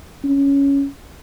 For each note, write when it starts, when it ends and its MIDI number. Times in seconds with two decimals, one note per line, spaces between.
0.24 0.86 61